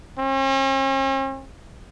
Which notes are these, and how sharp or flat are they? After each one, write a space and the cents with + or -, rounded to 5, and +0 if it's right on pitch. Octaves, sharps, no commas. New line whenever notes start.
C#4 -45